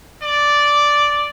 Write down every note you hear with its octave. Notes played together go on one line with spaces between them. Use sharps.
D5